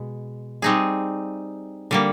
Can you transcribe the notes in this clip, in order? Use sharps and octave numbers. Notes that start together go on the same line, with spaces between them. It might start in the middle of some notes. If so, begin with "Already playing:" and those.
Already playing: B2 G#3
G3 C4 D#4 G#4
D3 G3 A#3